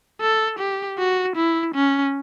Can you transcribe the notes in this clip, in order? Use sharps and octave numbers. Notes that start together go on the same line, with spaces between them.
A4
G4
F#4
E4
C#4